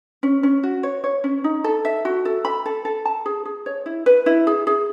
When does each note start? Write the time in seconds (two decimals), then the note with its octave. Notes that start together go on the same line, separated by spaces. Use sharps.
0.23 C#4
0.43 C#4
0.63 F#4
0.83 C#5
1.04 C#5
1.24 C#4
1.44 D#4
1.64 A4
1.85 E5
2.05 F#4
2.25 A4
2.45 B5
2.66 A4
2.85 A4
3.05 A5
3.26 G#4
3.45 G#4
3.66 C#5
3.86 E4
4.06 B4
4.26 E4
4.47 G#4
4.67 G#4